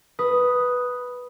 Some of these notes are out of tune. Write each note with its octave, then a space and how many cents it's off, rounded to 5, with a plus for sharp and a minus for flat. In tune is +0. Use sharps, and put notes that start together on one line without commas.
B4 +0 D#6 +0